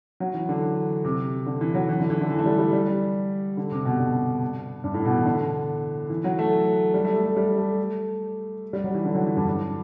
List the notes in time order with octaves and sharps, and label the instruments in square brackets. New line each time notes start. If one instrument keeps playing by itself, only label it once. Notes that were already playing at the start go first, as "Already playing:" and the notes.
[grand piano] F#3
E3
D3
C3
D3
E3
F#3
E3
D3
E3
D3
E3
A3
G3
G3
G3
D3
C3
B2
G2
G2
A2
B2
E3
D3
E3
F#3
A3
G3
A3
A3
A3
G3
A3
G3
F#3
E3
D3
F#3
E3
G2
G2